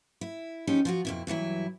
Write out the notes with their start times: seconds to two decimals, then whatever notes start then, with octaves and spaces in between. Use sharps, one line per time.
0.21 E4
0.67 F3 C#4 D#4 G4
0.85 F3 F4 F#4
1.05 F2 B2 E4
1.27 G2 E3 F#3 E4